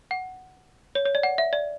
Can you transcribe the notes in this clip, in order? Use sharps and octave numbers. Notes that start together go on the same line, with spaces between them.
F#5
C#5
C#5
D5
F#5
E5
D5